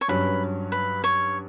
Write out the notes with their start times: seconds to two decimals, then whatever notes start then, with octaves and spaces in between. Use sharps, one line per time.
0.01 C#5
0.08 G2 F#3 C#4 B4
0.72 B4
1.04 C#5